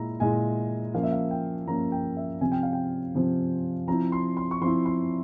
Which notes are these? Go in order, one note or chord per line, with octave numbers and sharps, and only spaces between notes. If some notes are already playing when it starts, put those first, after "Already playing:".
Already playing: A#2 G#3 E4 A#5
A#2 G#3 E4 G#5
F3 A#3 C#4 F5
E5
F5
G5
F3 A#3 C#4 A#5
G5
E5
C3 F3 C4 G#5
G5
F5
G5
C3 F3 C4
F3 C4 E4 A#5
C6
C6
C#6
F3 C4 E4 C6
C6